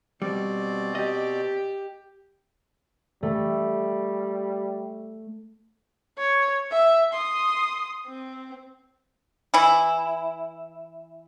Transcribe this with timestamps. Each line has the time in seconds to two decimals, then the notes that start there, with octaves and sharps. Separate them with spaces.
0.22 B2 G3 C4 D5
0.95 G4 D#5
3.23 G3 A3
6.18 C#5
6.72 E5
7.13 C6 D#6
8.07 C4
9.54 E3 E4